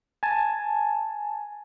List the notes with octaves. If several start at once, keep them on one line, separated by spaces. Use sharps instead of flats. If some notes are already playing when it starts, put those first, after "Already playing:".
G#5 A5